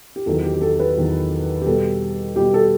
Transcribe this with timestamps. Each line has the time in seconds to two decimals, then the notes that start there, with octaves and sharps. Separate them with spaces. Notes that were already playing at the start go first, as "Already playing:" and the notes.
0.16 G4
0.26 E2 D#3 F#3 A4
0.44 G4
0.54 G4
0.61 A4
0.80 B4
0.97 E2 D#3 F#3
1.61 G4
1.66 B2 G3 A4
2.36 B2 G3 G4
2.54 A4